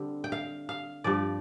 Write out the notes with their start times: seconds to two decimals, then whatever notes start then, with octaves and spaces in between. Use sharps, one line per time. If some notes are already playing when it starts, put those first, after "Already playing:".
Already playing: D3 G3 C4
0.24 G5
0.32 F5
0.69 F5
1.04 G2 F3 C4 D5